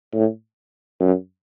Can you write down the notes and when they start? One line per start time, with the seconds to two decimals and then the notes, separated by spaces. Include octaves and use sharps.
0.14 A2
1.00 F#2